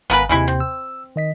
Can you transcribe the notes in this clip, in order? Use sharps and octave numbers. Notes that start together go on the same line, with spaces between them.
G#1 B3 A#4 B4 F5 G#5
D#2 C3 E3 G#3 E4
C4
E6
D#3 D#5 B6